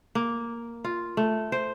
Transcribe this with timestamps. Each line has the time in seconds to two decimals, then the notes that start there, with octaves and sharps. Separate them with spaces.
0.15 A#3
0.84 F4
1.17 A3
1.52 C5